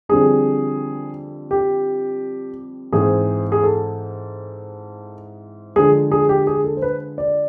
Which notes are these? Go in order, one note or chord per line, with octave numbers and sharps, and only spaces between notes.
F2 D3 G3 G#4
G4
G#2 E3 G#3 C4 G#4
G#4
A4
D3 F3 G#3 G#4
G#4
G4
G#4
A4
C5
B4
D5